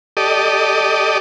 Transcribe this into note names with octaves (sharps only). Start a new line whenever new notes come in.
G4 A4 D5 D#5